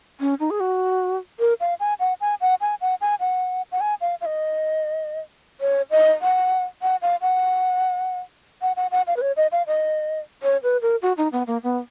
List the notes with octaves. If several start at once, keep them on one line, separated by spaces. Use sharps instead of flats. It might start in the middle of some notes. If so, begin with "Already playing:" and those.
C#4
D#4
G#4
F#4
A#4
F5
G#5
F#5
G#5
F#5
G#5
F#5
G#5
F#5
F#5
G#5
F5
F5
D#5
C#5
D#5
F#5
F#5
F5
F#5
F#5
F#5
F#5
F5
B4
C#5
D#5
F5
D#5
C#5
B4
A#4
F#4
D#4
B3
A#3
B3